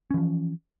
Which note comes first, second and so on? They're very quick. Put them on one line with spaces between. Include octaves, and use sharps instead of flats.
C#4 E3 F3